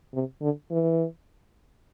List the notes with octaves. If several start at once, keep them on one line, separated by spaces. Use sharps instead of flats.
C3
D3
E3